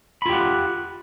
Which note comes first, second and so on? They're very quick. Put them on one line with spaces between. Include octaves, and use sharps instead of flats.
B5 F4 G4 F#5